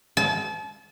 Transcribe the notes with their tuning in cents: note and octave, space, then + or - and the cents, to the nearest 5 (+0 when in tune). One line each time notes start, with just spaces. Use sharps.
A5 -35